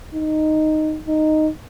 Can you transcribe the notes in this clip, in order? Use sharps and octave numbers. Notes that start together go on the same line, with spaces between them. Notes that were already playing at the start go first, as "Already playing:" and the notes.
D#4
D#4